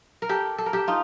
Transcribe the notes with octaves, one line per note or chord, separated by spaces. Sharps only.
A#4
G4 A4
A4
A#4
G4 A4
D#4 F4